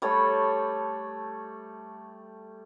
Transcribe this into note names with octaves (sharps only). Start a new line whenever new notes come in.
G3 A3 A4 C#5